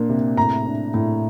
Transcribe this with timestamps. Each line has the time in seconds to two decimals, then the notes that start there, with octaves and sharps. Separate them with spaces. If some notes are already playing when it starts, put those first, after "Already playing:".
Already playing: A#2 A#3 D4
0.09 C3
0.37 A2 A#5
0.66 D4
0.94 A2